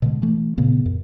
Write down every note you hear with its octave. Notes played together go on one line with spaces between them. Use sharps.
B2 D3 G#3
E3 A3
A#2 C#3 B3
F#2